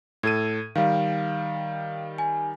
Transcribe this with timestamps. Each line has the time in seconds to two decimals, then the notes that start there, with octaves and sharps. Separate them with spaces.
0.23 A2 A4 G#6 D#7
0.76 D#3 G3 F5
2.18 G#5